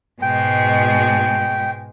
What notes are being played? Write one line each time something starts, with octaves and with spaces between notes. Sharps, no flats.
G#2 B2 G#3 G5